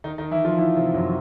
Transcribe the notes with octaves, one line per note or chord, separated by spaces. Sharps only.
D#3 D#4
D#3 D#4
E3 E4
F3 F4
E3 E4
C3 C4
F#2 F#3